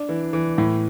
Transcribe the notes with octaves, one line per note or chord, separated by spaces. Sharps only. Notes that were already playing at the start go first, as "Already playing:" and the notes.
Already playing: D4
E3
E3
A2